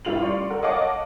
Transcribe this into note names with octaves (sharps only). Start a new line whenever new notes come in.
A1 G3 E4 F4 F7 F#7
D5 C6 C#6
A4 A#4 F#5
C#5 D#5 F5 F#5 A5 D6